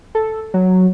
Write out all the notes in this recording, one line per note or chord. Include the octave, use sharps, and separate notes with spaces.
A4
F#3